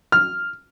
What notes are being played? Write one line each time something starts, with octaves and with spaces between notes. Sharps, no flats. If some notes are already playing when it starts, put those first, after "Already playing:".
F6